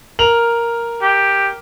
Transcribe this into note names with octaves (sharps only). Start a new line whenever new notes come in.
A#4 F7 F#7
G4